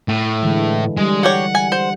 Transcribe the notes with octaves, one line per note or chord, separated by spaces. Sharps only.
A2
D3 E3 G#3
G3 G#3
F#3 G4 C#5 F#5
G#5
C5